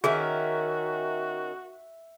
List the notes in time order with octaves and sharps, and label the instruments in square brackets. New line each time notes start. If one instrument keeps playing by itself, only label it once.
[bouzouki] D#3 C#4 A#4 [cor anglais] F#4 [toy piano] G#4 [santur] E5